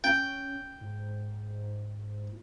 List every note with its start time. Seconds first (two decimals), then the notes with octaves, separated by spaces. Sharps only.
0.04 C#4 G5
0.81 G#2